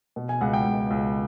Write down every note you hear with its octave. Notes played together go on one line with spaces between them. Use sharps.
B2
G#5
C#2 F#5
G5
C#2
C#2